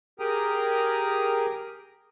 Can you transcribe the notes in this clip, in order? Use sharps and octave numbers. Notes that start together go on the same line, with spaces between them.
G4 G#4 A#4 G5 A#5 D#6